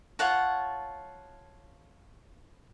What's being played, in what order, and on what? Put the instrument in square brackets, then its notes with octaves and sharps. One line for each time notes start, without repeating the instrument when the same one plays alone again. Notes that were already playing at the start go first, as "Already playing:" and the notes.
[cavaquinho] F4 C#5 F#5 A5